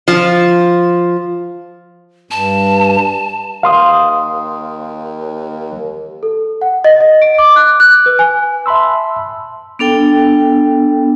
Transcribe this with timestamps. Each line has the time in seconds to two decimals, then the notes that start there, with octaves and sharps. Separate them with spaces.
0.08 F3
2.31 G2 A5
3.63 D#2 F5 C6 D#6
6.23 A4
6.61 F#5
6.84 D#5
7.01 D#5
7.22 D7
7.38 D6
7.56 F#6
7.80 F#6
8.06 B4
8.19 G#5
8.66 E5 A5 B5 C6 E6
9.79 B3 D4 A4 G5